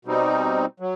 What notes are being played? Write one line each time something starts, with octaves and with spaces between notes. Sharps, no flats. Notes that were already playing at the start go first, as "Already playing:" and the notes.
B2 G3 C4 D#4
F#3